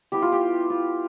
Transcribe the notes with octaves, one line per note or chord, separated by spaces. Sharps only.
G3 B3 E4 G4
F4
G4
F4